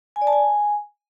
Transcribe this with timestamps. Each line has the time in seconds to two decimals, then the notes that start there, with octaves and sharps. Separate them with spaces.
0.16 G#5
0.22 D5
0.27 A5
0.33 G#5